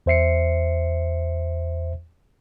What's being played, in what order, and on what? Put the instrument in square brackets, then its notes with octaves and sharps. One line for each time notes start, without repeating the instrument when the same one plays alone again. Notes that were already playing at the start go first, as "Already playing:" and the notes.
[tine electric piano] E2 C5 E5 C7 C#7